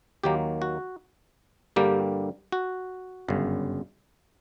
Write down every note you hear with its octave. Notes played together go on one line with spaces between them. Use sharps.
D#2 D#3 F#3 A#3 G4
F#4
G2 D3 G3 A#3 G4
F#4
G1 F#2 C#3